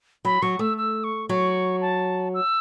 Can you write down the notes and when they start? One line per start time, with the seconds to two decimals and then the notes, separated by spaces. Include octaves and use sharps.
0.25 F#3 B5
0.42 F#3 C#6
0.59 A3 E6
0.77 E6
1.04 C#6
1.29 F#3 C#6
1.81 A5
2.34 E6